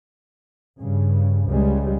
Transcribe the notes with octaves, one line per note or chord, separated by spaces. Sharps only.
G2 C#3
C#2 C#3 G3 G#3